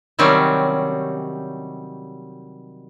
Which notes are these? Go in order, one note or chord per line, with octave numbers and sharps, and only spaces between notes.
C3 D#3 F#3 G3 C4 C#4